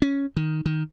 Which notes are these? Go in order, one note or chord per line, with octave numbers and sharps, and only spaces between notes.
C#4
D#3
D#3